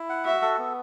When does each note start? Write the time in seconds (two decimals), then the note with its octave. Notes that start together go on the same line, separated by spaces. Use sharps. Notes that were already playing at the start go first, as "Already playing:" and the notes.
Already playing: E4
0.09 F#5
0.25 F#4 E5
0.42 A4
0.59 B3